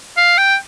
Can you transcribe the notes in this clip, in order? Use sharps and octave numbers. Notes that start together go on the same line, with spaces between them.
F5
G5